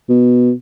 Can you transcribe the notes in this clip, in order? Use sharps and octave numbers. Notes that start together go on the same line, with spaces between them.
B2